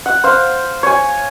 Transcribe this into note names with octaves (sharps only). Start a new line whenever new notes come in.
F#5
C5 F5
C#5 G#5